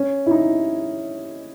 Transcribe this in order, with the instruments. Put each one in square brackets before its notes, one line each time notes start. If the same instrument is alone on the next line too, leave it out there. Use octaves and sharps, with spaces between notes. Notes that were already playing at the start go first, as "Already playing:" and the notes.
Already playing: [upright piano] C#4
E4
D#4